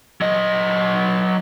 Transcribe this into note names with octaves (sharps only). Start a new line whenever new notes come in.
F#3 D#5